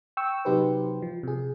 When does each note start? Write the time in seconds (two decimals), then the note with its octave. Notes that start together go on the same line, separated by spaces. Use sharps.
0.17 G5 C#6 E6
0.45 C3 F#3 D#4 G4 B4 C5
1.02 F3
1.23 C3 G#4